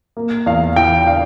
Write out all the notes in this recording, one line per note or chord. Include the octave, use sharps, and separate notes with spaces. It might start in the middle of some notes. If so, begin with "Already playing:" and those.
A#3
E2 F5
E3 G5
D4 F5